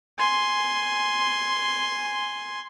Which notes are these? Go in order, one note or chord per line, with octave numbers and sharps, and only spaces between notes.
G#5 C6